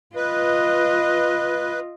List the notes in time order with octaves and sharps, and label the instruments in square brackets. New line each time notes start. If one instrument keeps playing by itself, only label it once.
[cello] F4 D#5 [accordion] B4